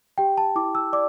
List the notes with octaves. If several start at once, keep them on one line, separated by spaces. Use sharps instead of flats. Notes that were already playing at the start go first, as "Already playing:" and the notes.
G4 G5
A5
E4 D6
E6
D5 D6